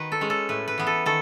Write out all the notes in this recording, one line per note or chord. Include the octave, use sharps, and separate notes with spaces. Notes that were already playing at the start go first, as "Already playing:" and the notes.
Already playing: D#3 F#4 B4
A4
G#3 C#4
A4
A2 B4
B4
E3 B3
A4
D#3 A4